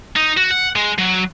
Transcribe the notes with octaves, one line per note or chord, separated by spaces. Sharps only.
D#4
F#4
F#5
G#3
F#3